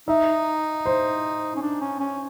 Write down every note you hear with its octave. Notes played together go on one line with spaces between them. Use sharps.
D#4 E5
C5
C#4
D4
C#4
C#4